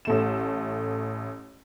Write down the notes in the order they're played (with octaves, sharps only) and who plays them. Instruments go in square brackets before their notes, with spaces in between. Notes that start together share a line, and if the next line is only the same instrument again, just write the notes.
[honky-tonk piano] A1 A3 E7